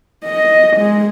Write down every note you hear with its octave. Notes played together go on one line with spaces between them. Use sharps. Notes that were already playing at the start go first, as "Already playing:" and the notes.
D#5
G#3